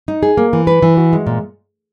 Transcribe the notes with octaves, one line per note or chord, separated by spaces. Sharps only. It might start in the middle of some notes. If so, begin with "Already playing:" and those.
D#4
G#4
A#3
E3
B4
E3
F#4
G#3
A#2